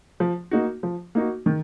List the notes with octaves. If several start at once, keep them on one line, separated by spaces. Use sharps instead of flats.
F3
A#3 D#4 F#4
F3
A#3 D#4 F#4
D#3